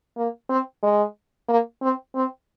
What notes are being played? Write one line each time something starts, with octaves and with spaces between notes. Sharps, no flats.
A#3
C4
G#3
A#3
C4
C4